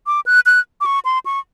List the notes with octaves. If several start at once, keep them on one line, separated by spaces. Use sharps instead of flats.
D6
F#6
F#6
D6
C#6
C6
C#6